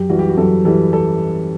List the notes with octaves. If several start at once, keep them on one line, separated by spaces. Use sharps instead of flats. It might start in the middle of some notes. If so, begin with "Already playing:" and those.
Already playing: F#2 G4
E3 G3 F#4
G4
F#4
F#2 A4
E3 G3 A4
A4